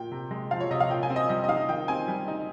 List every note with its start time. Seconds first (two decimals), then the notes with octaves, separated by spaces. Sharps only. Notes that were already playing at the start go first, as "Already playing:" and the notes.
Already playing: A#2 G5
0.12 C3
0.31 G#3
0.51 F3 F5
0.60 C#5
0.71 C3 D#5
0.80 F5
0.90 A#2 G5
1.03 G#5
1.10 C4
1.16 D#5
1.29 G3 D#5
1.44 D#5
1.48 D#4 F5
1.69 D#3 G5
1.88 C4 G#5
2.08 G3
2.28 D#4